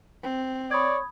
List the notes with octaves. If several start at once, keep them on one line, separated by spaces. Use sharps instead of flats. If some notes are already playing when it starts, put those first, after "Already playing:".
C4
C#5 D5 B5 D#6 G#6